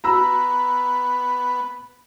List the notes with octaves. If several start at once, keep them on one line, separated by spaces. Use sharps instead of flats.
B3 A#5 B5 E6